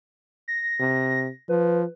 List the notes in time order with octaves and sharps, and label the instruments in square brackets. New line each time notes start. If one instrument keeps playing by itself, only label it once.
[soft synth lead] A#6
[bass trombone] C3
[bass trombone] F3 [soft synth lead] B4